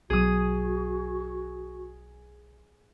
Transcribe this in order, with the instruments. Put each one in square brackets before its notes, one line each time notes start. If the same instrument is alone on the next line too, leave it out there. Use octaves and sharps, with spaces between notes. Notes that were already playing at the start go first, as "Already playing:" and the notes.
[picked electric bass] B1 F#3 [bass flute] F#4 [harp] G#4 D#6